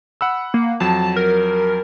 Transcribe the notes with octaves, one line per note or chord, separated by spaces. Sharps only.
F#5 B5 E6
A#3
F2 F#3 A5
A#4